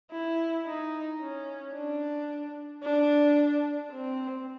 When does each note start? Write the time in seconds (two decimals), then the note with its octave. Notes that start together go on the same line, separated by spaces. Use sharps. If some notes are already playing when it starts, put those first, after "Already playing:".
0.12 E4
0.66 D#4
1.21 C#4
1.74 D4
2.83 D4
3.92 C4